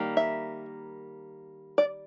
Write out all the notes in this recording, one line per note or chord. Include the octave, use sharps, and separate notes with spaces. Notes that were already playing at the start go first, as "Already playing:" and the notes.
Already playing: D#3 G3 A#3
E5
D5